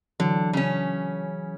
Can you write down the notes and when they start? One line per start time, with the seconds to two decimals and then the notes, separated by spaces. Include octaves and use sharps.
0.20 D3 E3 F#3
0.53 C#3 C#4